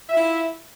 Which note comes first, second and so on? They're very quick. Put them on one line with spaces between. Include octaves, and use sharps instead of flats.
E5 F4 E4